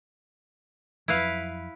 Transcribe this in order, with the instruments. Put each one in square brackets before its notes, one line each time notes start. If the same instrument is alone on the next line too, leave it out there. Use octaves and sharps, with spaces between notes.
[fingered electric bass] F2 F3 F#3 [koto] E4 B4 F5